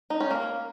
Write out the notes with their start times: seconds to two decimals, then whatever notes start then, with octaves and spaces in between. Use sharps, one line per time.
0.10 D#4
0.20 C#4
0.31 A#3